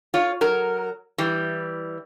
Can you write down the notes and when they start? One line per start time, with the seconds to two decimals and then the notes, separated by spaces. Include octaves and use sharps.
0.14 F4 C#5
0.41 F#3 A#4
1.18 E3 G3